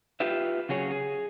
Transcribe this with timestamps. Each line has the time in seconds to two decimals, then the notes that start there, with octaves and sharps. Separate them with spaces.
0.20 F4 G4 B4 E5
0.69 C#3 F#3 G#4 C#5
0.91 G#4